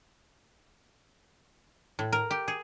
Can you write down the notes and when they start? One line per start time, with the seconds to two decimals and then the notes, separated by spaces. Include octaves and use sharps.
1.99 A2
2.12 A#4
2.31 G4
2.48 G#4